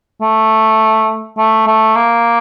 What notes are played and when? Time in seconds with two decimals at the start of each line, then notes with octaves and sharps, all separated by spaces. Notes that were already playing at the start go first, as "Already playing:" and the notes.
0.21 A3
1.38 A3
1.67 A3
1.95 A#3